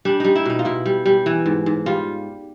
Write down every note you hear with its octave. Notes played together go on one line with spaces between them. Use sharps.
G3 D4
G3 D#4
E4
B2 D#4
F4
B2 E4
G3
G3
E3
G#2
G#2
G3 F4